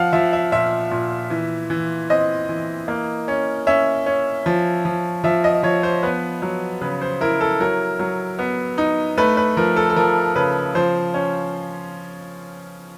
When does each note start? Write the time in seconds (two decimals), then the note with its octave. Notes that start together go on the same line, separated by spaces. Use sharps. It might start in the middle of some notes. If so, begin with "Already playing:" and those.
Already playing: F3 F5 F#5
0.13 F3 E5
0.33 E5
0.52 A#2 E5
0.91 A#2
1.30 E3
1.70 E3
2.10 C4 D#5
2.49 E3
2.88 A#3
3.28 C#4
3.67 C#4 E5
4.06 C#4
4.46 F3
4.85 F3
5.24 F3 E5
5.44 D#5
5.63 F3 C#5
5.83 C5
6.03 B3 B4
6.42 F#3
6.81 C#3 B4
7.01 C5
7.21 E4 A#4
7.41 A4
7.60 F#3 A#4
7.99 F#3
8.39 B3
8.78 D#4
9.18 A3 B4
9.37 B4
9.57 F3 A#4
9.76 A4
9.90 A4
9.96 F3 A#4
10.35 C#3 B4
10.75 F3 C5
11.14 C#4